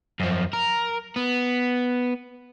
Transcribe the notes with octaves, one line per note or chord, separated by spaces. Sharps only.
F#2 F3
A#4
B3